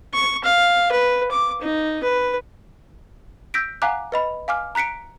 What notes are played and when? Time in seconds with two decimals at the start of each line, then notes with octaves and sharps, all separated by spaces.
0.14 C#6
0.44 F5
0.92 B4
1.31 D6
1.61 D#4
2.03 B4
3.54 E6 G6 A#6 B6 D7
3.82 F5 F#5 G#5 A#5 D6 F#6
4.12 B4 D#5 B5
4.48 F5 G#5 D6 F6
4.75 A#5 F#6 B6 C#7 D7